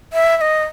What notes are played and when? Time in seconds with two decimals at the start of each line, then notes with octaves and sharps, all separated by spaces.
0.13 E5
0.37 E5
0.41 D#5